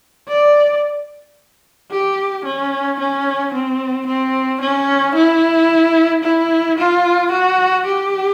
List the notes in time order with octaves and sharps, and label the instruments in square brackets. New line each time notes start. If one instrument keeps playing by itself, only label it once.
[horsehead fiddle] D5
G4
C#4
C#4
C4
C4
C#4
E4
E4
F4
F#4
G4